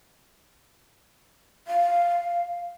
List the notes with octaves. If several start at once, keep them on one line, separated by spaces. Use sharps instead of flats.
F5